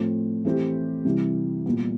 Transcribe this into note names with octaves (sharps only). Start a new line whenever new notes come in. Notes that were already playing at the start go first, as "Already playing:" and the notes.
Already playing: A2 F3 A3 C4
E3 A3 C4 E4 G4
C3 E3 G3
A#2 G3 B3